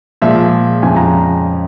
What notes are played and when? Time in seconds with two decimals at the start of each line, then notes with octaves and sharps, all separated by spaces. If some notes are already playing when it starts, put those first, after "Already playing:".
0.22 A#2 F3 G#3 E5
0.83 F2 C#3 F3 G#3 G#5
0.96 A#5